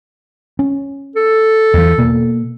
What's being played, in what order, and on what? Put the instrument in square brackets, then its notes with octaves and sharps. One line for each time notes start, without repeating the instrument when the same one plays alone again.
[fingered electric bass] C#4
[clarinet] A4
[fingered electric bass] E2 E3
B2 A#3